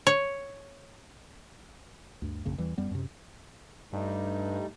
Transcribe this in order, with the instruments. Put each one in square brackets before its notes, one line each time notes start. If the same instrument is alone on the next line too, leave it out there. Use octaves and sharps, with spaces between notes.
[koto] C#5
[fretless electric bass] D2 G2
A#1 F#2 C#3 A#3
E2 E3 G3
F#2 G3 B3
F#2 C3
[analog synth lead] G2 [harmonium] G3 A3 D#4